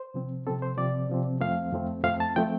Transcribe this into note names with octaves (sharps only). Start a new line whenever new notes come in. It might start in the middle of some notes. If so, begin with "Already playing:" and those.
Already playing: C5
C3 F3 C4
C3 F3 C4 A4
C5
C3 F3 C4 D5
C3 F3 C4
F2 F3 A3 C4 F5
F2 F3 A3 C4
F2 F3 A3 C4 F5
A5
F3 A3 C4 G5